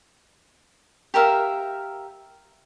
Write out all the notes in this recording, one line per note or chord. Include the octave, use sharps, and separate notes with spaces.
G4 A#4 E5 F5